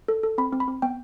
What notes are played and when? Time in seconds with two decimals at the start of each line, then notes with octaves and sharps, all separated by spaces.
0.08 A4
0.23 A4
0.38 C4 B5
0.53 C4
0.60 B5
0.68 C4
0.82 B3 G5